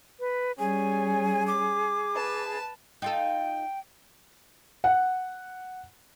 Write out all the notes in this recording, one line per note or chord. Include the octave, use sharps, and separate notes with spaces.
B4
G3 C#4 G#4 G#5
D6
B4 A5
D#4 F4 A4 G5
F#5